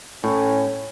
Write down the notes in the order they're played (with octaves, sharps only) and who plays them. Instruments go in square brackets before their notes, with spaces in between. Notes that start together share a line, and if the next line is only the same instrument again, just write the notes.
[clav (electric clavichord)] A2 [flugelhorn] C#4